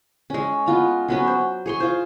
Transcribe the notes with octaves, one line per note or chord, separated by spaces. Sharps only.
G#3 C#4
B3 F4 A#5
F#3 B3 C#4
C5
G#4 C#5 C6
F4 C5